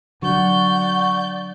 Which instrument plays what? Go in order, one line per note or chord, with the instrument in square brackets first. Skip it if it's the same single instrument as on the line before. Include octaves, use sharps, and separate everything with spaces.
[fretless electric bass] D3 F#3 [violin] D5 G6 [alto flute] F#5 [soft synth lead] C#6